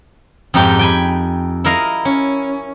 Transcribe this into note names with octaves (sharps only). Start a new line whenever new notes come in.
F2 G#2 D#4 G4
G5 G#5 B5
E4 A#4 D#5 F5
C#4